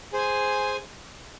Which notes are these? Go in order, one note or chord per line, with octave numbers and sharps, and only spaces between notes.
G#4 C5 G#5